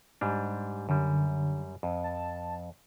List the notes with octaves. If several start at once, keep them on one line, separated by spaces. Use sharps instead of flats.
G#2 G3 D4
F#2 D3 G3
F2
A5